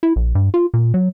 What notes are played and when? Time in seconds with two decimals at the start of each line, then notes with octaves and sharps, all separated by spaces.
0.03 E4
0.16 A#1
0.35 G2
0.54 F4
0.74 A#2
0.94 F#3